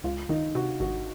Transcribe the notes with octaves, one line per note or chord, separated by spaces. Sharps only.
C#2 F4
D#3 D#4
C3 F#4
G#1 F#4